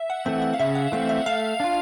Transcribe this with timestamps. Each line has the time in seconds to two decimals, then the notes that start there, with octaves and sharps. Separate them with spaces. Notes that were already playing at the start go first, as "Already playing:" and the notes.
Already playing: E5
0.10 F#5
0.26 E3 A3 C4 E5
0.42 E5
0.53 F5
0.59 C#3 E5
0.75 F#5
0.92 E3 A3 C4 F5
1.09 E5
1.26 A3 F5
1.60 D4 F4